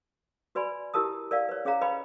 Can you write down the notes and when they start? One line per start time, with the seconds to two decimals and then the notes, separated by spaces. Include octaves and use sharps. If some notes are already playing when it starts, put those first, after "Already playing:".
0.55 F#4 B4 D5 G#5 B5
0.94 E4 G4 A#4 A5 D#6
1.31 A#4 D5 F5
1.49 B4 C#5
1.65 C#4 G#4 C#5 F5 A#5
1.81 B4 D#5 F5 G5 B5